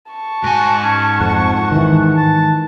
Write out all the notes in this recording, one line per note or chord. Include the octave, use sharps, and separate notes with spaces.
A5 C#6
G#2 F#4 G#5
C#4
F2 F#5
D#3 E3
A5